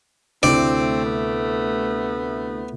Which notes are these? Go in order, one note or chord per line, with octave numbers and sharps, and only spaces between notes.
D2 C3 A3 C4 E4 D5
B3